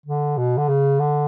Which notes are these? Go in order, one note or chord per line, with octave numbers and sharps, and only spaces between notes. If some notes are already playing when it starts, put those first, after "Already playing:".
D3
B2
D3
C#3
D3